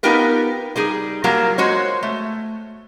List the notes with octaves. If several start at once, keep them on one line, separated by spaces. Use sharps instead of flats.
B3 D#4 F4 G4 A#4 B4
G3 D#4 G#4
F#3 G3 A#3 F4 A#4 A#5
G#3 F#4 C5 C#5
A3